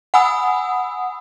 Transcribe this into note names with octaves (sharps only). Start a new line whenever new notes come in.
F#5 G#5 B5 D#6 E6